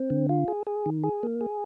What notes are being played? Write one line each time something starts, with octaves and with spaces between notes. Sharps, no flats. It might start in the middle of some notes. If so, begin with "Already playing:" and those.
Already playing: C4
D3
F4
G#4
G#4
D#3
G#4
A#3
G#4